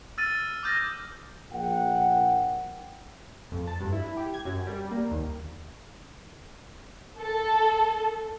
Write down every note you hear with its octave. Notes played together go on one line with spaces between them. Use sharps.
E6 F6 A6 D#7
D6 D#6 F6 G6 A6 A#6
A#1 F#5 G5
F2
A5
G2
E4
G4
G#6
F#2
G3
A#3
D#2
A4